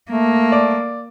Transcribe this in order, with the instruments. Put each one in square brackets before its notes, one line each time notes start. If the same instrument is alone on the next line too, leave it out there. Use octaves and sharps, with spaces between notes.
[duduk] A3 [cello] A#3
[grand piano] D5